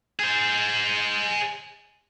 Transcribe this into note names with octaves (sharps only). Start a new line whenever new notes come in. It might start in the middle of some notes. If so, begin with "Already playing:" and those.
G#4 C5